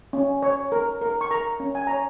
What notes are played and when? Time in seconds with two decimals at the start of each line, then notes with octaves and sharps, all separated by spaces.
0.13 C#4
0.42 C#5
0.72 A#4
1.01 A#4
1.21 C#6
1.31 A#4 A#5
1.60 C#4
1.75 G#5
1.87 C#5 A#5